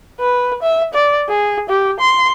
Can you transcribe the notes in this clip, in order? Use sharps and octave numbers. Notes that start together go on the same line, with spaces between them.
B4
E5
D5
G#4
G4
C6